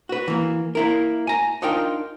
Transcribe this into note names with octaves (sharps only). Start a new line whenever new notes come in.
F#4 B4
E3 A#3
A#3 E4 A#4
G#5 A#5
D4 D#4 F4 A#4 G5